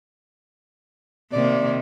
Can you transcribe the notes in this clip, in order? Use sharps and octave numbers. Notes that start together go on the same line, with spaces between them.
C3 D#3 A#3 D5